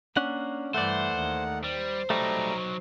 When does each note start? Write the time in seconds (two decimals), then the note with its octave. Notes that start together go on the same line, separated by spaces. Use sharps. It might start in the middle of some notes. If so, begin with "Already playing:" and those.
0.17 A#3 C#4 D4 F#5
0.74 G2 E3 A3 C5 D5 F#5
1.13 D#2 D#3
1.64 G3 C5
2.10 F#3 G3 A3 D#4 A#5